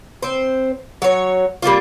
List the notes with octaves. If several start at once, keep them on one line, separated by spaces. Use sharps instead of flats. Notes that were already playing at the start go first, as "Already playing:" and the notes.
C4 C5
F#3 C#5
G3 A#3 C4 F4